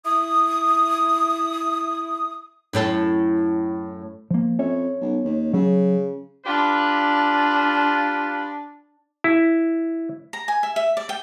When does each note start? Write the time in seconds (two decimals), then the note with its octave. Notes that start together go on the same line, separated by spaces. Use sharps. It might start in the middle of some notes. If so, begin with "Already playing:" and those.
0.06 E4 D#6
2.73 F#2 A2 A4
4.31 F3 A#3
4.59 F2 C#4 C#5 E5
5.01 B1
5.24 D#2
5.53 C#3 F#3
6.46 D4 F4 G4 B4
9.24 E4
10.33 A#5
10.48 G#5
10.63 E5
10.76 E5
10.97 D5
11.09 G5